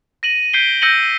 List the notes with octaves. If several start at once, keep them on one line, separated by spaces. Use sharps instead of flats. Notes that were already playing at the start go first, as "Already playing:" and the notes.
A#6 D#7 F#7
G6 B6 C7 D7 G7
E6 G6 A#6 C#7 D#7 F#7